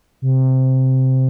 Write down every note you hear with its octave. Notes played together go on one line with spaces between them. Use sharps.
C3